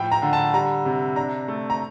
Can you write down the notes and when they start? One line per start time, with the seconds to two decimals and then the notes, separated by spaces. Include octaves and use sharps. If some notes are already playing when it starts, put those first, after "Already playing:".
Already playing: A2 F3 G5
0.12 A#5
0.22 D3
0.33 A5
0.54 G3 A#5
0.85 C3
1.16 D4 A#5
1.48 A3
1.70 A#5